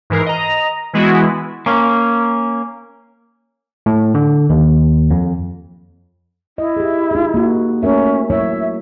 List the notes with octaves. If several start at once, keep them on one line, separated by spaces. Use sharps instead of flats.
G#2 E3 A#4 C7
D#5 A#5
E3 G#3 B3 E4 F#4
A#3 C#4
A2
D3
D#2
F2
E4 D#5
G4 G#4
D#4 G#4
A#3 F#4
A3 C#4 A#4 E5
F#3 E4 C#5 E5